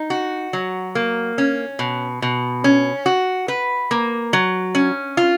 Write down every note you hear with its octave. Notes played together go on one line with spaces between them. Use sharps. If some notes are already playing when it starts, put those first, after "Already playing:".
Already playing: D#4
F#4
F#3
A#3
C#4
B2
B2
C#4
F#4
B4
A#3
F#3
C#4
F4